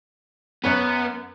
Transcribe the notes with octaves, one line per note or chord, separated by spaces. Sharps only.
F#2 B3 C#4 B4